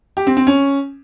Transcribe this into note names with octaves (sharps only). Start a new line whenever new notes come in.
G4
C4
C4
C#4